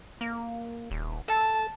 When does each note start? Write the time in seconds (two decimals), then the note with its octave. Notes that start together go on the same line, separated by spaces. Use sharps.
0.21 A#3
0.91 D#1
1.28 A4 A5